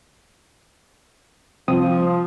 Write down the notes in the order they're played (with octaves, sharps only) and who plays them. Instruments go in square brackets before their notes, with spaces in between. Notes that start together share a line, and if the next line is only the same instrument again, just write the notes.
[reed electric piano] C2 C4 D#6 [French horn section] F3